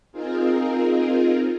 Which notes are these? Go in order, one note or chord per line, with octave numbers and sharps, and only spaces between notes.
C4 D#4 F4 G#4 A#4